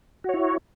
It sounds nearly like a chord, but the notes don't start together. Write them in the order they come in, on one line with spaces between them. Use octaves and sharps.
F#4 C#5 E4